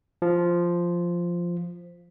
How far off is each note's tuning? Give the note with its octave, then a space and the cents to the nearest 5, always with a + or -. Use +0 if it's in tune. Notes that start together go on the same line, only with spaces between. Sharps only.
F3 -5